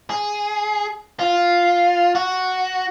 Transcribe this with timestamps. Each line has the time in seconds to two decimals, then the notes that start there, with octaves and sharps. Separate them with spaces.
0.10 G#4
1.19 F4
2.15 F#4